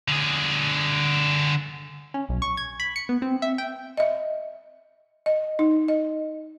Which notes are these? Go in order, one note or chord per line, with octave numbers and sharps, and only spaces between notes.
D3 G#4
C#4
B1
C#6
G#6
B5
C#7
B3
C4
E5
G5
D#5 E5
D#5
D#4
D#5